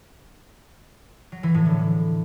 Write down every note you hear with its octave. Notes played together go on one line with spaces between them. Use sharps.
F#3
E3
A2
D3